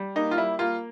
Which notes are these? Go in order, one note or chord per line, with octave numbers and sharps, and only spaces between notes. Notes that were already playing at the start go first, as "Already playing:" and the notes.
Already playing: G3
A#3 D#4
F4
G3 E4
A#3 F4